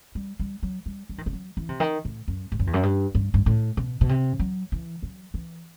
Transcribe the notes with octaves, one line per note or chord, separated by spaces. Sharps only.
G3
G3
F#3
G3
G3
D#3
E3
F#3
E3
C3
D#3
A2
F#2
G2
F#2
E2
F#2
G2
G2
G2
A2
B2
B2
C3
F#3
E3
F#3
E3